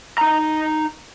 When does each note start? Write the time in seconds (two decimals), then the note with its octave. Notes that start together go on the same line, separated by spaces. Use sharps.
0.18 D#4 A#5